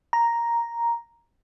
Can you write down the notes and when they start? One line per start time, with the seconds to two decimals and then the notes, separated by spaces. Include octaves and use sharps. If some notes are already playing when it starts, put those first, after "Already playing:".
0.13 A#5